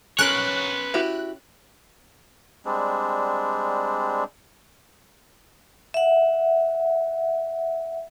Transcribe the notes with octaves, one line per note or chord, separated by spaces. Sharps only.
C#4 A#4 B4 C#5 C6 F#6
E4 F#4 G4
G3 G#3 C4 D4
E5 F#5